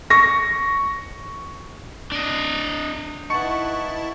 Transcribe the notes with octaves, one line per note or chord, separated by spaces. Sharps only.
C#6 A#6
D4 D#5
D#4 E4 B4 F#5 A5 C#6 C#7